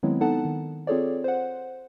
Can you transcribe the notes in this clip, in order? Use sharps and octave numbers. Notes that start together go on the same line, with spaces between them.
D#3 F#3 G#3 B3 C4 E4
B3 D#4 A4 F#5 A5
D#3
C4 F4 G#4 A4 C#5 D5
C5 F#5